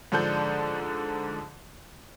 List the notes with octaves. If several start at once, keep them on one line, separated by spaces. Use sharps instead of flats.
G#2 D3 F3 D4 A4 G6